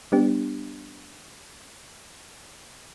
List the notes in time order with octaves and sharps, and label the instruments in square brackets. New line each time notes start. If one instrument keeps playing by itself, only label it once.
[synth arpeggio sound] G3 B3 D4 G4